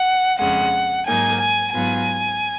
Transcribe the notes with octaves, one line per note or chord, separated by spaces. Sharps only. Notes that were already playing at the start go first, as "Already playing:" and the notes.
Already playing: F#5
F2 C#3 G#3 F#5
G#2 F#3 A#3 D#4 G#5
G#5
G#2 F#3 B3 F4 G#5